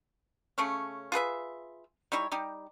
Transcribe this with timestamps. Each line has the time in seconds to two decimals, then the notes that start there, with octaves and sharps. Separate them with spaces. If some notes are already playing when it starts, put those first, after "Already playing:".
0.58 C#3 A3 C#4
1.12 F4 G#4 B4 E5
2.12 G3 D#4 E4 C#5
2.32 G3 D#4 G4